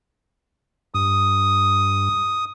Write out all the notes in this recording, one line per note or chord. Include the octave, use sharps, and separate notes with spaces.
G2 D#6